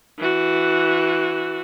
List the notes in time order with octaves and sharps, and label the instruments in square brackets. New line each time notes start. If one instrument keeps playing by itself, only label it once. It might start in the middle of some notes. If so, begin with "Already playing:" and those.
[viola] E3 F#4